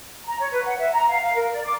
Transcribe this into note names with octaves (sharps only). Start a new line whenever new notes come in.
A#5
C#5
B4
F#5
E5
A#5
F5
F5
A#4
D5
D6